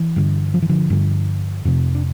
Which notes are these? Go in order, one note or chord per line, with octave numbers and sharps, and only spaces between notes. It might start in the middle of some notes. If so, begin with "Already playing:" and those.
Already playing: E3
G2 D3
F3
E3
D3 F3
G2 D3
F2 C3
D4